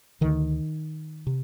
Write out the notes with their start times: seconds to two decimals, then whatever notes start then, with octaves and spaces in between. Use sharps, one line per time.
0.21 D2 D3 D#3
1.27 C3